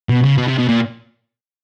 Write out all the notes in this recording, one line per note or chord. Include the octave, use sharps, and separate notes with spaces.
B2
C#3
B2
C3
B2
A#2